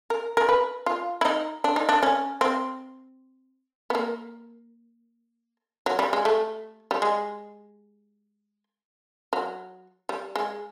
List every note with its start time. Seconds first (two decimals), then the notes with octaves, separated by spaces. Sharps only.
0.10 A#4
0.37 A#4
0.49 B4
0.86 F4
1.21 E4
1.25 D#4
1.64 D4
1.76 D#4
1.89 D4
2.03 C#4
2.41 C4
3.90 B3
3.95 A#3
5.86 F#3
5.99 G3
6.13 G#3
6.25 A3
6.91 G3
7.02 G#3
9.33 F#3
10.09 G3
10.36 G#3